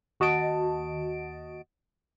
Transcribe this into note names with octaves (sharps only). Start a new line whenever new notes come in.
D#2 F#4 D#5 A5 D7